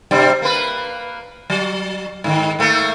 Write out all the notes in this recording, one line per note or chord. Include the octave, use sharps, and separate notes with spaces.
G2 C3 G3
A#3 B4
F#3
G#2 D#3
G#2 A3 A#3